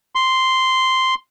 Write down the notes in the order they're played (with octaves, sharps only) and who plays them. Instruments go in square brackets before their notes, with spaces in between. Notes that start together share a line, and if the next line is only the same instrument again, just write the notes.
[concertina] C6